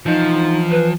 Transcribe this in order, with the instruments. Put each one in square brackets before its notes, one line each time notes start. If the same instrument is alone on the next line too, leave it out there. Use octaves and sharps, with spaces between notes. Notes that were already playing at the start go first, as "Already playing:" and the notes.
[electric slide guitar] E3 D#5 [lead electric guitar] F3 [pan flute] D#4
[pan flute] B4